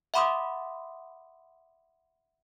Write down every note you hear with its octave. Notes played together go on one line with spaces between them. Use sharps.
E5 F#5 B5 C6 D6 D#6